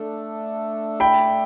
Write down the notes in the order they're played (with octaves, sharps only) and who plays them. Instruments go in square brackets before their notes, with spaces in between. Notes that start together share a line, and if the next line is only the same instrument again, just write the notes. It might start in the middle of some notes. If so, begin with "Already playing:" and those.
Already playing: [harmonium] A3 D4 A4
[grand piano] G5 B5